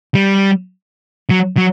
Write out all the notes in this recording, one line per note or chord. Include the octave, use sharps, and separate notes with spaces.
G3
F#3
F#3